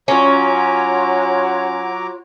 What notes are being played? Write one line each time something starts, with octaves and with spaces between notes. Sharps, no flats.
F#3 C#4 F4 F#4 C#5 A#5 D6